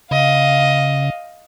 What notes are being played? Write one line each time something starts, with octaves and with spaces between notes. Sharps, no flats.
C#3 D#5 F5